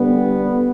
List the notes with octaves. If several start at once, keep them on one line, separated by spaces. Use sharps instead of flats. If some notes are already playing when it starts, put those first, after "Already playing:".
Already playing: D3 G3 B3